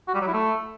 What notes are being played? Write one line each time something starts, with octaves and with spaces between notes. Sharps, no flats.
F#4
G3
F#3
E4
A3